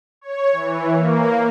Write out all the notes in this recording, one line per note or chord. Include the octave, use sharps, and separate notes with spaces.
C#5
E3
A#3